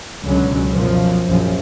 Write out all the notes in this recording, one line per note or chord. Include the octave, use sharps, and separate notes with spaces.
C#2 B2 D3 F#3 C#4
F#2 B2 F3
A#1 F#2 F3